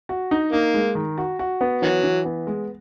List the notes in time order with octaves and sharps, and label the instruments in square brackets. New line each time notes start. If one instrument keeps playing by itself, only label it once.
[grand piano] F#4
D#4
[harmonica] A#3 [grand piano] D#4
[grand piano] G#3
D#3
F#4
F#4
B3
[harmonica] D#3 F#3 [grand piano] E3
[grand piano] E3
B3
G#3